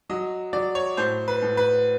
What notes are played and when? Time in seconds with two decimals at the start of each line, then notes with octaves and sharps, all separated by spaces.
0.09 F#3 D#5
0.53 F#3 D5
0.75 C#5
0.97 A2 C5
1.28 B4
1.42 A2
1.57 B4